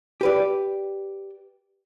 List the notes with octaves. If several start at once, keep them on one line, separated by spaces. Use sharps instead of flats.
G4 B4 D5